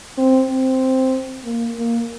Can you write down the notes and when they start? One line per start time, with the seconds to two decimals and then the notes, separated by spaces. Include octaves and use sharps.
0.17 C4
0.49 C4
1.44 A#3
1.75 A#3